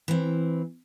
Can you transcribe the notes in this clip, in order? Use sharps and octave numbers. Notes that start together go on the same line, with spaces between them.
E3 C4